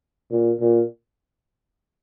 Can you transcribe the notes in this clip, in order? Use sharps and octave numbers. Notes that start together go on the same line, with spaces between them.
A#2
A#2